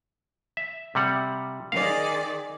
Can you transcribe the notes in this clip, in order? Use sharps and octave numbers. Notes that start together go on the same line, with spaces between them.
E5
C3 G3 F#5
D#3 G#4 D5 F5